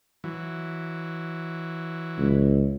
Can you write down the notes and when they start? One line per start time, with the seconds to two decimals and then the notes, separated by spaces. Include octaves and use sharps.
0.24 E3 F#3
2.18 C#2